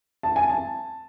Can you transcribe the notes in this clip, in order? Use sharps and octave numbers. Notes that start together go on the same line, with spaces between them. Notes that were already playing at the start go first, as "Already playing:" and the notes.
A5
G#5
A5